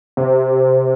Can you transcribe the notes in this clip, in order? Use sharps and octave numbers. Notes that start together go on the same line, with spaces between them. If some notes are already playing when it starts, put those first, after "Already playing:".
C3